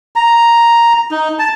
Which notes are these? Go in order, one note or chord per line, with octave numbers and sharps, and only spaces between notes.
A#5
D#4
A5